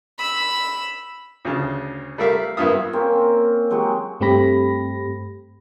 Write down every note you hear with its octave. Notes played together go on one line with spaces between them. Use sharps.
B5 E6
D2 C#3 A5
G3 A3 A#4 E5 F5
G2 A#3 B3 F4 E5 D#6
A#3 C4 C#4
F#3 G#3 F#4 G4
G2 A3 C4 G4 B5 A#6